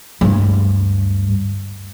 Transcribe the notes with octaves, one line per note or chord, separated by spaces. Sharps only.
D2 G2